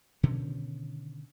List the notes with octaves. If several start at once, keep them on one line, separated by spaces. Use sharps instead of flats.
B2 D3 D#3 C#4